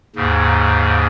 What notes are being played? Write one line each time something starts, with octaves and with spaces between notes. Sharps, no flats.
D#2 G#2 C#3